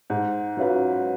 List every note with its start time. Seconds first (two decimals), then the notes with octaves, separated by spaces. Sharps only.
0.10 G#2
0.57 F#3 C#4 F4 B4